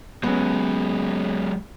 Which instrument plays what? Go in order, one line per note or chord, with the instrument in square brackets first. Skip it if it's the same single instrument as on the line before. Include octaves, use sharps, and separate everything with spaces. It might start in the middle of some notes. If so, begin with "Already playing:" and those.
[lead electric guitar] F#3 G#3 [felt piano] B3 C#4